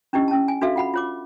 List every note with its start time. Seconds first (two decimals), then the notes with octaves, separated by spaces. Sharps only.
0.13 C#4 D4 E4 G4 D#5
0.28 C#4 A5
0.48 G#5
0.61 D4 F#4 A4 E5 F5
0.76 F4 F#5 B5
0.94 F4 C#5 D6